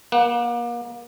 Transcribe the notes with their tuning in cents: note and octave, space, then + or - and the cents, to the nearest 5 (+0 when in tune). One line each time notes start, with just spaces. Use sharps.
A#3 +35 F#5 +15